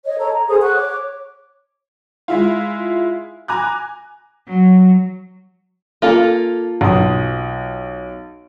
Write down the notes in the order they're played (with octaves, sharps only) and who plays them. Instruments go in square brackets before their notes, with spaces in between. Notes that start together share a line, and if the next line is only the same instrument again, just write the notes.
[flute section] C#5 D#5
A4 C#5 A#5
A#5
G#4 A4 C5 D#6
F#5 C#6 F#6
C#5 D6
[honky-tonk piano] G#3 E4 F4
G#5 A#5 D6 F#6
[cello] F#3
[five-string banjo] A#3 F4 A4
[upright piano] B1 D#6